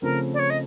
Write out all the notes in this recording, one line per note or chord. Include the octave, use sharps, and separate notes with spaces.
C#3 F3 A3 C4 A#4
D5
C#5
D#5